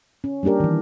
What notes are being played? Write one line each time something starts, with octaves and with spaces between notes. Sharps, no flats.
C#4
G3 A#3 D4 G4 A#4
D#3 E3